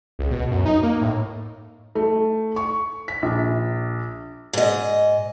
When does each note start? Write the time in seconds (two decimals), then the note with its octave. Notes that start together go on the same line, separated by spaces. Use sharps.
0.19 C#2
0.31 B2
0.51 F#2
0.66 D#4
0.83 A#3
1.01 A2
1.95 A3
2.56 C#6
3.08 B6
3.22 A#1
4.53 G#2 D#5